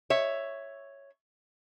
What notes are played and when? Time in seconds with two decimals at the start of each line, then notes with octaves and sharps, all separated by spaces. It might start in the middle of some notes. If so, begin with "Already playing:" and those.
0.10 C#5 E5